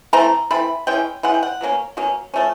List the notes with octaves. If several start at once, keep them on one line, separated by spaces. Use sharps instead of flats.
E3 A3 C4 A#5
E3 A3 C4 B5
E3 G#3 C#4 G5
E3 G#3 C#4 F#5
G5
F#5
B2 F#3 A#3 C#4
B2 F#3 A#3 C#4
F3 A3 C#4